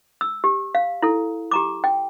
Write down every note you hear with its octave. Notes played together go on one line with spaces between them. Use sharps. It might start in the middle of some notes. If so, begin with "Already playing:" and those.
E6
G4
F5
E4 A4
G4 A#5 D6
G5